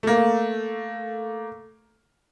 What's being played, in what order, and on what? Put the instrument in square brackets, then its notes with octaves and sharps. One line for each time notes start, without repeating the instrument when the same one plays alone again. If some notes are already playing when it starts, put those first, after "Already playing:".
[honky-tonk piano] A3 A#3